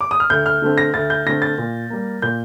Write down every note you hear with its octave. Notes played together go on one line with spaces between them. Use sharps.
D6
D#6
F6
D2 G6
F6
D3 A3 C4
A#6
D2 A6
G6
D3 A3 C4 A#6
A6
A#2
G3 A#3
A#2 G6